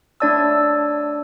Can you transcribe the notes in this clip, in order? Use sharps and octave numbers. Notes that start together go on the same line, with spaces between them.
A3 D4 C#5 D5 A5 E6